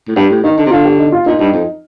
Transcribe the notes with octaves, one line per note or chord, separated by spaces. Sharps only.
A2
G2 G4
A2
D#3 D#4
D3
C3
D3 F4
G4
D#4
F4
A#2 D#4
G2
F2